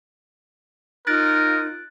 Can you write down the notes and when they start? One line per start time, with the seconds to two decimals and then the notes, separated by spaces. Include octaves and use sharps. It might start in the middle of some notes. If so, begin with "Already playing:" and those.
1.07 D#4 F4 A#4 F#6 A6 D7